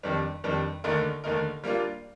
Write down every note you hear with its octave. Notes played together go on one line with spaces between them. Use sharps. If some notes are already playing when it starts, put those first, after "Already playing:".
F2 D#3 G3 D4
F2 D#3 G3 D4
D#2 D3 A3 D#4 A#4
D#2 D3 A3 D#4 A#4
G3 A#3 D4 F4